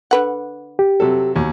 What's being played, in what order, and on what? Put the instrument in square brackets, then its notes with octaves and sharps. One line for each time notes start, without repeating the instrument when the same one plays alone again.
[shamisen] D3 B4 F#5
[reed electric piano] G4
[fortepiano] C3 F#3 A4
D#2 B2